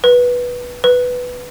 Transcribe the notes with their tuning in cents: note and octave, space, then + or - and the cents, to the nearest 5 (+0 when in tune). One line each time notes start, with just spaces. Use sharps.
B4 -10
B4 +5